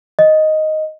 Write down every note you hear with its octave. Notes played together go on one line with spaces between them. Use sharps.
D#5